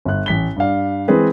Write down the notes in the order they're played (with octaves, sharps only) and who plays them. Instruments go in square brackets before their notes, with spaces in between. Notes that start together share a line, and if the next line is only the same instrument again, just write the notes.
[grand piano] G1 F#6
A1 B6 G7
G2 D5 F5
E3 G#3 C4 G#4 B4